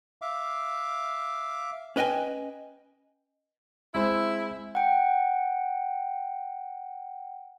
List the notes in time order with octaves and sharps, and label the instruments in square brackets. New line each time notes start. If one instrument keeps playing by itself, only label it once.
[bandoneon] E5 F5 D6
[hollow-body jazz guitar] C#4 B4 D#5 G5 G#5
[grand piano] G#3 C4 [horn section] E4
[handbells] F#5 G5